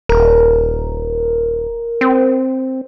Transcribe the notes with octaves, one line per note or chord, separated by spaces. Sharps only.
D#1 A#4
C4